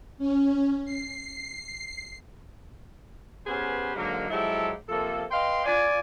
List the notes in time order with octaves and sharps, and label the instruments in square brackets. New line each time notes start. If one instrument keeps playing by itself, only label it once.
[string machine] C#4
C7
[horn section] B3 C#4 G4 G#4 B4 C5
G#2 D3 F#3 G#3 A#3
F3 F#3 G#3 E4 G4 A4
C3 F3 A#3 A4
B4 D#5 F5 G5 C6
F4 D5 G#5